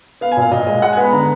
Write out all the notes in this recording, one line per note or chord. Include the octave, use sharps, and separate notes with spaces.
B3 F5
G#5
A#2 F5
A#2 D#5
G#3 D#5
G#3 F#5
B3 G#5
B5
D3 A#5